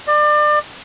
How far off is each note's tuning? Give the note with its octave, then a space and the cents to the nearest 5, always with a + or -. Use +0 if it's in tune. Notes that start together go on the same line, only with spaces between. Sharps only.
D5 +30